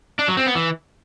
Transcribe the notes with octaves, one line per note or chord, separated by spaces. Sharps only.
D4
F#3
C4
B3
E3